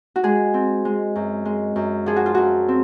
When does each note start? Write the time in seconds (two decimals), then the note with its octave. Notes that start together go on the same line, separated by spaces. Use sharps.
0.16 F#4
0.23 G#3 G#4
0.54 C4
0.85 G#3
1.16 F#2
1.45 G#3
1.76 F#2
2.06 F3 G#4
2.16 F#4
2.26 F4
2.35 F#2 F#4
2.68 C4